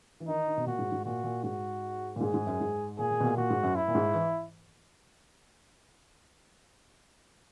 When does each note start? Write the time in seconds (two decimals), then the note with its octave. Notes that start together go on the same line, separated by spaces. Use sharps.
0.20 E3
0.28 D#3 D#4
0.48 D#3
0.57 B2
0.66 A#2 F#4
0.79 G#2
0.92 G#2
1.05 A#2 F#4
1.24 A#2
1.43 G#2 F#4
2.16 A#2
2.21 G#2 G#4
2.34 G#2
2.47 F#2
2.60 G#2
2.99 A#2 G#4
3.11 A#2
3.20 B2
3.24 A#2
3.37 A#2 F#4
3.50 G#2
3.63 F#2
3.75 E4
3.88 A#2
3.95 G#2
4.14 E3